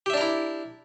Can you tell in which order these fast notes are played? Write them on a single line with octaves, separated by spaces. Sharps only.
G4 E5 D4 A#4 E4